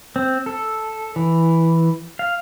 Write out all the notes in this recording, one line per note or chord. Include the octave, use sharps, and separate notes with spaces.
C4
A4
E3
F5